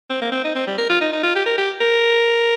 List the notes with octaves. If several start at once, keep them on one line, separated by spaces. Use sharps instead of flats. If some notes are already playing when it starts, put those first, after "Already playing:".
C4
A#3
C4
D#4
C4
G3
A#4
F4
D#4
D#4
F4
G4
A#4
G4
A#4